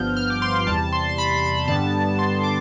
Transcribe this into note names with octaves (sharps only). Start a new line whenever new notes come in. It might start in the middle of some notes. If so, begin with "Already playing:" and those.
Already playing: G1 G2 F3 B3 F6 G6
F6
D6
C6
E2 C3 G3 A5
C6
C6
B5
B5
G2 D3 G3 B3 A5
C6
D6